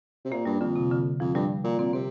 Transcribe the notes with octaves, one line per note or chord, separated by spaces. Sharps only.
C3
A#2 A#3
G2 G3
F2 D3
C3
D3
F2 F3
G2 G3
A#2
A#2 C4
C3 C4